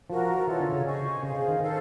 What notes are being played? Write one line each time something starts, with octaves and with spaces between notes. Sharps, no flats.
F3 F#4 A#4 D5
E3 C#4 F4 A4 C#5
D3
C#3
C5 D#5 G#5 C#6
C#3 G#4 C5 F5
D#3
D#3 A4 C5 F5